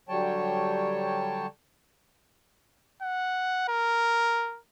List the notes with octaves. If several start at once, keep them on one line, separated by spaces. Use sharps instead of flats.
D3 F#3 G3 C#5 G5 A5
F#5
A#4